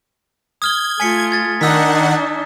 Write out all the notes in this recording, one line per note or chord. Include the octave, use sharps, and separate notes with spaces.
D#6 F6 G#6 G7
A3 F4 G#5 B6 C#7
G#6 A6
D#3 D4 D#4 F#5 D#6 E6 B6